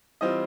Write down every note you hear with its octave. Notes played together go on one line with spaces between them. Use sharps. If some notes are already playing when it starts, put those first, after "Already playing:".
E3 G3 C4 F4 D#5